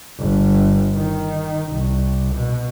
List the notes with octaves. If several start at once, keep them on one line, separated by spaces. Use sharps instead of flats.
G1
D#3
C2
B2